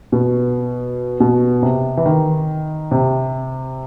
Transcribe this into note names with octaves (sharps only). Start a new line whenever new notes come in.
B2
B2
C3
E3
D#3
C3